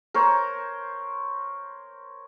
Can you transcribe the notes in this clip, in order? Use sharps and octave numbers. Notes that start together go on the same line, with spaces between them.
A#4 C5 C#5